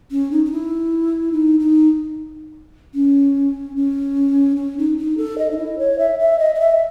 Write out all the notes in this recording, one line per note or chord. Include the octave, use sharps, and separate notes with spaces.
C#4
D#4
D#4
E4
D#4
D#4
C#4
C#4
C#4
D#4
D#4
A4
D#5
D#4
E4
C#5
E5
E5
D#5
D#5
E5